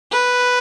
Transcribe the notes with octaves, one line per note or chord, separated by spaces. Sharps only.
B4